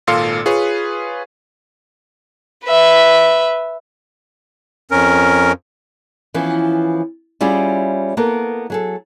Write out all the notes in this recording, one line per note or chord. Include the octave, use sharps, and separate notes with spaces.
G#1 A#2 A4 F5 C6 C#7
F4 G#4 B4 C#5
B4 E5
F2 C#4 A#4
E3 F3 B3 C#4
G3 C#4 E4 F4 G#4
A#3 B3 A4 A#4
F#3 G#4 A4